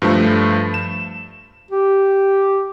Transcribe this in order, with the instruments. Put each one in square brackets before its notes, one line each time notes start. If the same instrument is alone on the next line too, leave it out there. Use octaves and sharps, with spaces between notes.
[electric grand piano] G2 F3 A3
E7
[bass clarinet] G4